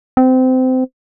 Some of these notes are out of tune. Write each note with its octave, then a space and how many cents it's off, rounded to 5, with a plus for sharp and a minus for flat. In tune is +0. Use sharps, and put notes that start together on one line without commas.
C4 -25